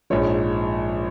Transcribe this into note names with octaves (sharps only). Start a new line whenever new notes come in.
A#1 G#2 F3 C#5